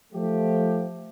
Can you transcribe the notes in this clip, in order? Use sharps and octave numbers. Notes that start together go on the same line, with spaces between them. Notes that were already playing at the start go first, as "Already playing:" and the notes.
F3 A3 G4